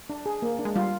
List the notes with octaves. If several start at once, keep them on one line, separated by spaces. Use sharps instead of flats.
D4
G#4
A#3
D4
G#3
G3 F4